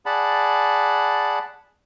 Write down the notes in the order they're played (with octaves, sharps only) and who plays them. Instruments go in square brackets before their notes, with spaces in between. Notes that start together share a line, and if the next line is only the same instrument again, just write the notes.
[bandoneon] G#4 D5 F#5 A5 B5